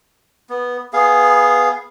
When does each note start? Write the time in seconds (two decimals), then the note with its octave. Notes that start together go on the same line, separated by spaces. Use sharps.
0.49 B3
0.93 B3 G#4 F5